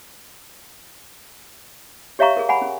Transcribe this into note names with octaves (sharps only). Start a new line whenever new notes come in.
G4 C#5 E5 F5 A#5 C#6
G#4 A#4
F#5 G#5 B5
C#4